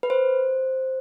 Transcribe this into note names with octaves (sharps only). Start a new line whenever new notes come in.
B4
C5